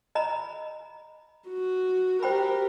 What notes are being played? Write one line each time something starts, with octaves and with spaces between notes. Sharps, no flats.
D#5 A#5 B5
F#4
G4 A#4 C5 G5 B5